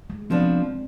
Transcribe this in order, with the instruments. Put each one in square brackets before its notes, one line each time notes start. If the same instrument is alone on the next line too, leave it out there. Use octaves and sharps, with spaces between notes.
[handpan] G#3
[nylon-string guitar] F3 B3 D4 [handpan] C4